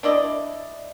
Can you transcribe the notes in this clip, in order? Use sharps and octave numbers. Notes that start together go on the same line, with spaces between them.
D4 E4 D5 D#5